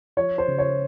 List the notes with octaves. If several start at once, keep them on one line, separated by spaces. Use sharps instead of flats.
F3 C#5
C5
C#3
C#5